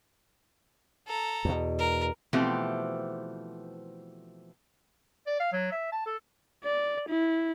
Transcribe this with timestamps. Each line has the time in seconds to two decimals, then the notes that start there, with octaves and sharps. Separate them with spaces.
1.07 A4 A#5
1.45 E2 B2
1.78 A#4
2.33 B2 E3 F3 A3 C4 G4
5.27 D5
5.40 F5
5.52 F#3
5.72 E5
5.92 A5
6.06 A4
6.64 D5
7.09 E4